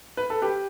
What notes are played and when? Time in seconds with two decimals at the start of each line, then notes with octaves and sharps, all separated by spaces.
0.17 B4
0.30 A4
0.42 G4 B4